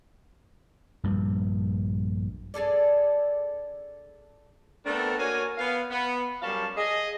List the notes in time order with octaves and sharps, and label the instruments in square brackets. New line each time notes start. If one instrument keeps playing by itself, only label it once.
[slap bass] A#1 G2 G3
[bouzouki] D4 G#4 A4 D5
[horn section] A3 B3 C4 D4 A4 A#4
A#3 F#4 A#4 C#5 G#5
B3 F5
B3
F#2 G3 C#4 F5 A5
G#4 D#5